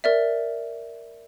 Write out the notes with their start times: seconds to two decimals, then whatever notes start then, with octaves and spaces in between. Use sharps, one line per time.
0.04 A#4 D5 E5